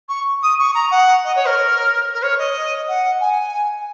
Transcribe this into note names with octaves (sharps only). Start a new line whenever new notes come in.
C#6
D#6
C#6
A#5
F#5
D#5
C#5
A#4
A#4
C#5
D#5
F#5
G#5